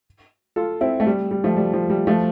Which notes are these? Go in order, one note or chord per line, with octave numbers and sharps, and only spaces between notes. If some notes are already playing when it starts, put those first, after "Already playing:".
F4 A4
C4 E4
A3
G3
G3
F3 A3
G3
F3
G3
F3 A3